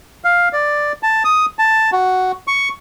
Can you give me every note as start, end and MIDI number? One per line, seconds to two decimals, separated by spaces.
0.24 0.49 77
0.53 0.92 74
1.03 1.23 81
1.24 1.46 87
1.59 1.90 81
1.92 2.32 66
2.47 2.69 85